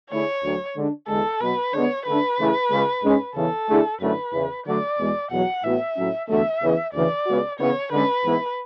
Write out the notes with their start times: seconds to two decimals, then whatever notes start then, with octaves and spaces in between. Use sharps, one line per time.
0.10 D3 A3 E4 G#4 C#5
0.43 D2 D3 F#3
0.76 D3 G#3 D4
1.08 E2 D3 G#3 A4
1.40 B2 F#3 B3 B4
1.73 D3 G#3 B3 C#5
2.06 D3 A3 D4 B4
2.38 C#3 E3 A3 E4 G#4
2.71 C#2 C#3 G#3
3.03 G#2 G#3 C#4
3.36 E2 C#3 E3 A4
3.69 D3 A3 E4 G#4
4.00 F#2 D3 F#3 A3 E4 B4
4.33 E2 C#3 E3
4.66 D3 F#3 A3 D5
4.98 E2 B2 G#3
5.31 E2 B2 F#3 F#5
5.64 A2 E3 B3 F#4 E5
5.96 A2 F#3 C#4
6.28 E2 D3 F#3 A3 E5
6.62 E2 C#3 E3
6.94 D2 C#3 E3 D5
7.26 C#2 C#3 G#3 B3 F#4
7.59 C#3 E3 B3 C#5
7.91 D3 G#3 C#4 B4
8.24 G#2 E3 B3 E4